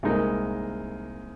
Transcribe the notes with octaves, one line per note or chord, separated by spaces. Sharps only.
C2 A#2 G#3 D#4 A#4